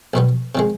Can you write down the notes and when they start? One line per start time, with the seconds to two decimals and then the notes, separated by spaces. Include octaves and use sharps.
0.14 B1 B2 G3 B3
0.55 C3 D#3 G#3